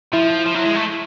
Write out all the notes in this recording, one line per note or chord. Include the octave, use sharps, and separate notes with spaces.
F3 E4
F3
F#3 E4
G#3
A3